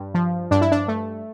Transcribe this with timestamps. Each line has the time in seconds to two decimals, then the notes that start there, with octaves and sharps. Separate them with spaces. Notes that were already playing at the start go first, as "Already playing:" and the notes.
Already playing: G2
0.14 F3
0.51 G2 D4
0.61 E4
0.72 D4
0.88 A3